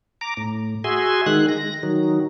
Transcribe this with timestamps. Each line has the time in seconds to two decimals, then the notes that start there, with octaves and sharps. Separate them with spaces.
0.21 A#5 D6
0.37 A2
0.84 F#4 G#4 E5 G#5 C6
1.26 D#3 G#3 F#6
1.49 A#6
1.83 D#3 F#3